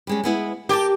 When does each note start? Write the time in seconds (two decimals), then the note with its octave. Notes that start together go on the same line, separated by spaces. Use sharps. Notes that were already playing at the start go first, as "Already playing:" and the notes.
0.07 G3 G#3 C#4
0.24 G#3 B3 E4
0.69 G4 A#4 G#5 A5